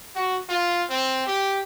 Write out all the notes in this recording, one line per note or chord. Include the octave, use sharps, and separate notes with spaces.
F#4
F4
C4
G4